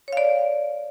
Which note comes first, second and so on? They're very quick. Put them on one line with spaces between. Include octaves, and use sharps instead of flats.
C#5 F5 D5